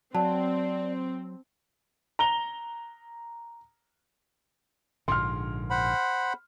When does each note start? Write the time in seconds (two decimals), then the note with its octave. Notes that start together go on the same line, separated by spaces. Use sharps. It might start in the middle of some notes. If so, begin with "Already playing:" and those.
0.14 F#3 C4 D5 A5
2.19 A#5 F7 G7
5.08 A#1 G#2 D3 C6 F6
5.70 C5 F#5 B5